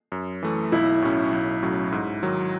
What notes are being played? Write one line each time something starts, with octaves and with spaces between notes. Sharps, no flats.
F#2
E3 A3
B1 E4
A2 F#3 C#4
B1
A2 F#3 C#4
G#2
D#3 F#3